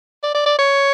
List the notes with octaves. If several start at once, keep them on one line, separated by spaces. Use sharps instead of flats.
D5
D5
D5
C#5